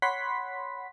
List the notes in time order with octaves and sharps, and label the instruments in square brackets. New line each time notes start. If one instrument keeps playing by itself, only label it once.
[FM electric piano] C#5 F#5 B5 C6 B6